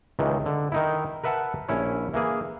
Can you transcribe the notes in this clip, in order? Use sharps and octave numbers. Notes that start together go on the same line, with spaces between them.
C#2 D#3 E3
D3
D#3 D#4 E4
A#4 B4 E5 F#5 A5
A#1 C#4 E4 C#5
E3 A#3 G#4